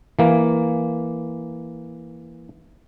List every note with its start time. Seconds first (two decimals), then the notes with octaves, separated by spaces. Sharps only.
0.19 E3 A#3